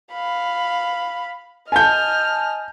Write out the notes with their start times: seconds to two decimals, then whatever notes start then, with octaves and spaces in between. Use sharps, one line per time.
0.13 F5 B5
1.72 D#5 G#5 A5 F6 G6